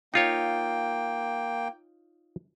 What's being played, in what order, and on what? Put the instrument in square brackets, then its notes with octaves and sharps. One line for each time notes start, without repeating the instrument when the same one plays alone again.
[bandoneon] A#3 G5 [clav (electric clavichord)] D#4 F4 C#5